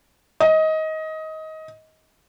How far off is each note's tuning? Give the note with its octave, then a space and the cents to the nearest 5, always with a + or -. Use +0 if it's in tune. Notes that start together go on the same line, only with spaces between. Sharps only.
D#5 +20